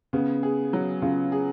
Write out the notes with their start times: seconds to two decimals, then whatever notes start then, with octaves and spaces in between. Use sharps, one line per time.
0.13 C#3 B3
0.43 G#4
0.73 F#3
1.02 C#3 F4
1.32 G#4